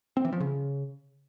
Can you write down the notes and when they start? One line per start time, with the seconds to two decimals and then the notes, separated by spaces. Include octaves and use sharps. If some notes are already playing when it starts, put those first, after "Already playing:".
0.17 C4
0.25 E3
0.32 F3
0.40 C#3